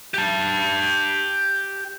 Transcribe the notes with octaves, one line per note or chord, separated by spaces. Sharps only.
G4 A5